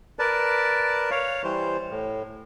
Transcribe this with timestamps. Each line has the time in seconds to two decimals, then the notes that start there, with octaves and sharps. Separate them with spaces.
0.19 A#4 B4 D5 A5
1.11 C#5 F5
1.44 E3 G3 C5
1.90 A2